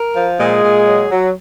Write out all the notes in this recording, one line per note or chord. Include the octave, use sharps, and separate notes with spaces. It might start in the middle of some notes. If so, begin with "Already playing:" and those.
Already playing: A#4
F3
A#2 G#3 G#4
A#2
F#3
F#3